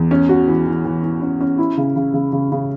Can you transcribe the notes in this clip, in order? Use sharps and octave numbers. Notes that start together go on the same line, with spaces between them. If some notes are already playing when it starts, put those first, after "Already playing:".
Already playing: E2
C#4
F#4
E3
E3
E3
E3
C#4
C#4
E4
C#3
C#3
C#3
C#3
C#3